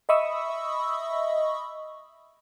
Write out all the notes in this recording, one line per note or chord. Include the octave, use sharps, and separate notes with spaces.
D#5 E5 B5 C#6 D#6 E6